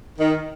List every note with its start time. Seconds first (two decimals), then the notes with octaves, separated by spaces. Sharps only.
0.19 D#3